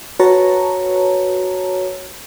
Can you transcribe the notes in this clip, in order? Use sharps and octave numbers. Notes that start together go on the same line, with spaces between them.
F#4 B4 C#5 A5 A#5